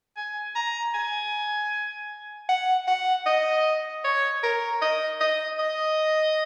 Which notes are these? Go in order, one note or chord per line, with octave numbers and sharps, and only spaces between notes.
G#5
A#5
G#5
F#5
F#5
D#5
C#5
A#4
D#5
D#5
D#5